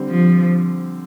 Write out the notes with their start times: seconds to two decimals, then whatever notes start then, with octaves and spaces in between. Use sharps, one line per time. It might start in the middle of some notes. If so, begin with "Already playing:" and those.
Already playing: D3 G3 C4
0.10 F3